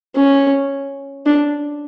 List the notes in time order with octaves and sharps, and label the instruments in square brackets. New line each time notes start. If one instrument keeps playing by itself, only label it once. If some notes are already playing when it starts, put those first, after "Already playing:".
[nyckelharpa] C#4
D4